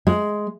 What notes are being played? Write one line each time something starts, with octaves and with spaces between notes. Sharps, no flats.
G#3